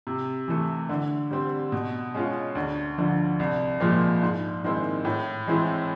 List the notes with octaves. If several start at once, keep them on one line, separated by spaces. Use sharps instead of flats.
C3
E3 A3
D3
G3 C4
B2
G#3 C#4 F4
D2
D3 F3
C2
A#2 F3 G#3 C4
G#2
D#3 G#3 C4 E4
A2
E3 G#3 C4 E4